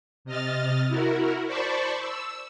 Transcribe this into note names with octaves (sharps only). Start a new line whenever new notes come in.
C3 D#5 F6 A6
E4 F#4 A#4
C5 D5 A5 B5 C#6
E6